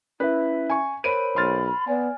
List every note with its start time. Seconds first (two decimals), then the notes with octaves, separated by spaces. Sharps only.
0.20 C#4 E4 B4 E5
0.70 G#5 C#6
1.04 A#4 C5 C#5 B5 D7 D#7
1.36 B1 C6 F6 A6
1.87 B3 D5 G#5